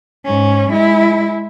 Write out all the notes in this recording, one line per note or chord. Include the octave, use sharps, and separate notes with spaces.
G#2 C#4
G#3 E4